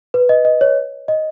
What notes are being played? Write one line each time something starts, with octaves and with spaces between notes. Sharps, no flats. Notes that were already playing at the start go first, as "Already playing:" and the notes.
B4
D#5
D#5
C#5
D#5